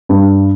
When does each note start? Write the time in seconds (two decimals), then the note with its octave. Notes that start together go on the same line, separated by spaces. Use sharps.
0.09 G2